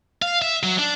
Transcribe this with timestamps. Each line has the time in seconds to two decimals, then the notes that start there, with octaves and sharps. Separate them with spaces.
0.22 F5
0.42 E5
0.63 F#3
0.79 D4